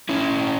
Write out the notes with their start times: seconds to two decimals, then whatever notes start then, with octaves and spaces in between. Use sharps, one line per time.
0.09 C#4 E4